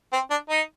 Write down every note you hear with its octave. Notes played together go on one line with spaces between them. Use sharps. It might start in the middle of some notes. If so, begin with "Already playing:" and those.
C4
D4
D#4